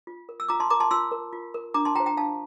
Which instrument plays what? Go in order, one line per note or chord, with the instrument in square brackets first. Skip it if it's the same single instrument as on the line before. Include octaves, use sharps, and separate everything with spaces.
[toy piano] F4
A#4
E6
F4 A#5 D6
A5 C6
A#4 A#5 D6
A5 C6
F4 C6 E6
A#4
F4
A#4
D4 A#5 D6
A5 C6
F4 G5 A#5
C5
G5 A#5
D4 F5 A5